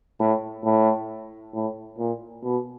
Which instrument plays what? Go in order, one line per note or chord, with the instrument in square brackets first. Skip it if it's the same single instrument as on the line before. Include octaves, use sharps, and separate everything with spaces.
[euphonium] A2
A2
A2
A#2
B2